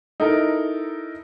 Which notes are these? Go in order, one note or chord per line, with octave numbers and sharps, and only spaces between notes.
D#4 E4 A4 A#4